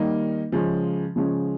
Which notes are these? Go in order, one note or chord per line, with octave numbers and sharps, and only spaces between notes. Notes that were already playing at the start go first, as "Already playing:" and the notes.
Already playing: D#3 G3 A#3 D#4
C#3 F3 G#3 C#4
C#3 F3 G#3 C#4